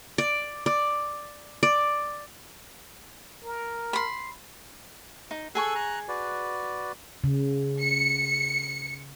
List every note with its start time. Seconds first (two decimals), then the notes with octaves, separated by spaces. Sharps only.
0.18 D5
0.66 D5
1.63 D5
3.43 A#4
3.93 B5 C6
5.31 D#4
5.55 G#4 A4 G#5 C#6 E6 F#6
5.75 A#5 F#6
6.08 F#4 B4 D5
7.24 C#3
7.81 C#7